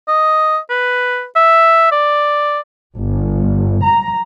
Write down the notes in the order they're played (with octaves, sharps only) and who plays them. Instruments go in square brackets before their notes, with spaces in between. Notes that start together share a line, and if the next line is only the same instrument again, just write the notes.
[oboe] D#5
B4
E5
D5
[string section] G1
A#5